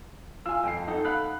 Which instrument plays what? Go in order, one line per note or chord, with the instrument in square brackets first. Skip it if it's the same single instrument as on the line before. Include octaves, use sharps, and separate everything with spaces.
[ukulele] F4 G#5 [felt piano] E6
[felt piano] F2 C7 [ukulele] G5
[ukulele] D#4 A4 F#5
[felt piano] F5 B5 F#6